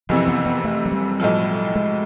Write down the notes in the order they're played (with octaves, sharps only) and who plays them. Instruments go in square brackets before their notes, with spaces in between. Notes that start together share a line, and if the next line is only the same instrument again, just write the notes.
[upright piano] F#1 F2 C3 E3 [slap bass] F3
[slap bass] B3
B3
A3
F#3
G3
[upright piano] B1 A2 F3
[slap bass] G#3